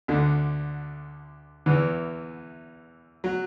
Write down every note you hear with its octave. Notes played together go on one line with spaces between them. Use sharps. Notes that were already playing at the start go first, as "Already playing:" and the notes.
D2 D3
E2 E3
F#3